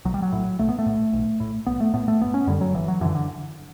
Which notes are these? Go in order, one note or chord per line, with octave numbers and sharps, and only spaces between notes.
B1 F#3
G3
F#3
A2
B1 A3
B3
A3
A2
B1
A2
B1 B3
A3
A2 B3
A3
G1 B3
C#4
F#2 D3 G3
F#3
G1 E3
F#3
F#2 D3 E3
D3